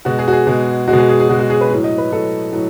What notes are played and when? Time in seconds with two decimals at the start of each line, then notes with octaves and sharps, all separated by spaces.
0.05 B2 G#3 F#4
0.19 G#4
0.28 F#4
0.33 G#4
0.47 B2 G#3
0.88 G#3 F#4
0.93 B2
0.98 G#4
1.09 G#4
1.20 G#4
1.29 B2 G#3 F#4
1.39 F#4
1.50 G#4
1.61 B4
1.71 A2 F#3
1.84 D#5
1.98 B4
2.12 A2 F#3 A4
2.53 A2 F#3